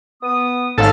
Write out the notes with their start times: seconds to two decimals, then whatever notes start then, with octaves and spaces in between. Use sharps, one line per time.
0.22 B3 D#6
0.78 G#1 G#2 C#3 G#3 C#4 A4 F5